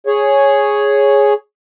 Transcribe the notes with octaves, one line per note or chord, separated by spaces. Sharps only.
G#4 C#5